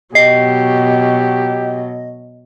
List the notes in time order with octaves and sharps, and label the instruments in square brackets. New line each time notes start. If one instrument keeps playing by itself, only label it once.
[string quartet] B2 F#3 [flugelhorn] G4 [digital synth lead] D#5 [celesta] C7